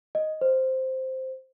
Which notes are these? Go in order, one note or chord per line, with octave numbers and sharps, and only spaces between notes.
D#5
C5